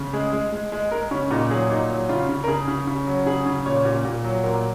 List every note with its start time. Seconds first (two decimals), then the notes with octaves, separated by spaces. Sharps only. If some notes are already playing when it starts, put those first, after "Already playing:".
Already playing: C#3
0.13 G#3 G#4
0.33 G#3
0.52 G#3
0.72 G#3
0.91 G#3 A#4
1.11 C#3 C#4
1.31 A#2 D#4
1.50 F#3 G#4
1.70 A#2 D#4
1.90 F#3
2.09 C#3 F4
2.29 C#3
2.44 A#4
2.48 C#3 G#4
2.68 C#3
2.87 C#3
3.07 F#3
3.26 C#3 G#4
3.46 C#3
3.66 A#2 C#5
3.85 A#2
4.05 A#2
4.24 F#3
4.44 A#2 A#4